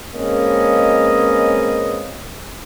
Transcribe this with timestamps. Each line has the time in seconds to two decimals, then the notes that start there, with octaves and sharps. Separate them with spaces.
0.14 G#3 A#3 C4 C#4 B4 D#5